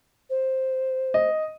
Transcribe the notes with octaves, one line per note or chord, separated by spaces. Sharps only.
C5
D#5